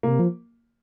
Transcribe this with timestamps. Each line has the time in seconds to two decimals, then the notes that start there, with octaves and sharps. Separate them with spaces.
0.03 C3 A#3
0.19 F3